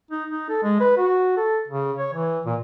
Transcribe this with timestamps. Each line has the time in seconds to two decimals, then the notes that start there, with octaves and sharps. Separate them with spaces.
0.11 D#4
0.30 D#4
0.49 A4
0.63 G#3
0.80 B4
0.97 F#4
1.37 A4
1.68 C#3
1.99 C#5
2.14 E3
2.46 A#2